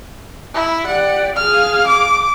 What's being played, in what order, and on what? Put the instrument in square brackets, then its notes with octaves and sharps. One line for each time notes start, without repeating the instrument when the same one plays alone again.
[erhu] E4
[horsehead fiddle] G4 D5 [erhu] F#5
[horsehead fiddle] G#4 F5 [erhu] F6
[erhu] D6